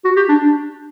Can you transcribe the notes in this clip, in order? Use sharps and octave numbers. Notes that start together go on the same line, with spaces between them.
F#4
G4
D4
D4